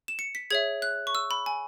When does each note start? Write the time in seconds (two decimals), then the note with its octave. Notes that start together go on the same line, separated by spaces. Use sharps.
0.08 E7
0.19 C#7
0.35 B6
0.50 G#4 C#5 E5 G#6
0.82 F#6
1.07 C#6
1.15 E6
1.31 B5
1.46 G#5